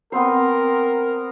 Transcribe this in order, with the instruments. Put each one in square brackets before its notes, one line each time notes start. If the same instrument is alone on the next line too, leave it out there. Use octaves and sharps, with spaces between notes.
[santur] B3 C4 C5 [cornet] A#4